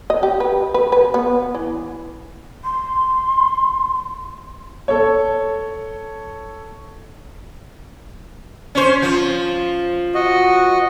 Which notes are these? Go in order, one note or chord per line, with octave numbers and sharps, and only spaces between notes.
D#5
G4
B4
B4
B4
B3
E3
C6
A4 C#5
C#4 C5
F3
F#4 D#5